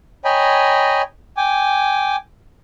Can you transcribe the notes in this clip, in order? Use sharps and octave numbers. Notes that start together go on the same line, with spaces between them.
C#5 D#5 G5 G#5 A#5 B5
G5 G#5 D6